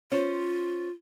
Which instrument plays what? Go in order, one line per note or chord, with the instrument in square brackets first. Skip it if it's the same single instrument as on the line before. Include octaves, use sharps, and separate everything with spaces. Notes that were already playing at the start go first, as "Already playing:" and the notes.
[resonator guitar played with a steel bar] C#4 C5 [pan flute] F4